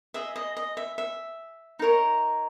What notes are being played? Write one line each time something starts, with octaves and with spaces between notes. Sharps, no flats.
G#4 D#5 E5
D#5
D#5
E5
E5
D#4 A#4 C#5